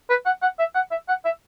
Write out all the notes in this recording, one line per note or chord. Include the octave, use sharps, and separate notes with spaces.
B4
F#5
F#5
E5
F#5
E5
F#5
E5